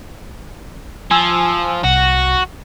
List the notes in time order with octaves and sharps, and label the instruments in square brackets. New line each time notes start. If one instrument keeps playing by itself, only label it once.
[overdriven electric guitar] F3 [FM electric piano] G#5 E6
[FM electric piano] C2 [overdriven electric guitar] F#4